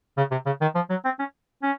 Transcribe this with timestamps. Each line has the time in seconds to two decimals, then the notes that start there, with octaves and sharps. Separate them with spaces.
0.18 C#3
0.31 C3
0.46 C#3
0.61 D#3
0.75 F3
0.90 F#3
1.05 C4
1.19 C#4
1.63 C#4